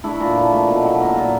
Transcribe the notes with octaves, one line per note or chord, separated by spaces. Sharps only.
A3 D4 E4
A#2
F3
A3
B2
F#3
A#3
A#2